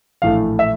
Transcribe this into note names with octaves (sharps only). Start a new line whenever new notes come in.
A#1 A2 E3 A3 F5
E5